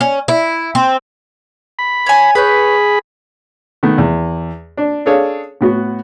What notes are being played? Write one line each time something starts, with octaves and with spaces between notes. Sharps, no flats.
C#4
E4
C4
B5
C#5 G#5
G#4 B4 C#5 B5 G6
D#3 A3 B3
E2
D4
D4 G#4 A4 C#5 F5
A2 B3 F#4